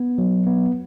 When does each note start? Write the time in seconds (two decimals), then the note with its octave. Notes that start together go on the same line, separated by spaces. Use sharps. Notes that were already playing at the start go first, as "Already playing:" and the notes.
Already playing: B3
0.18 F#3
0.47 B3